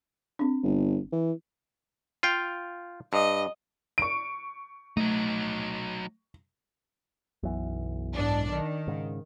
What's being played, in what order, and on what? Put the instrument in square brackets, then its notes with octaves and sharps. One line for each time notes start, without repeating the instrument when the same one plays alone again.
[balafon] C4 D4
[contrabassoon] G1
E3
[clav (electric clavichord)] F4 F5 G5
[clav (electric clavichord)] G2 [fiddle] D#5
[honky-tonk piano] C#6 D7
[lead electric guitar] F#3 D#4 [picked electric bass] A3
[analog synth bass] B1 [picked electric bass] F#2 E3
[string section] G#2 D4
D#3
[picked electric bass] G#2 C#3